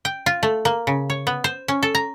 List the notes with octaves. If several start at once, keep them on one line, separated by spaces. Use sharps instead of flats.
G5
F4
A3
A#3
C#3
C#5
B3
C5
C#4
A4
A#5